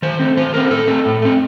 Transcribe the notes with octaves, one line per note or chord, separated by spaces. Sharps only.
D#3 C5
A3 C4
D#3 C5
A3 C4 A#4
A2 A4
A3 C4
A2
A3 C4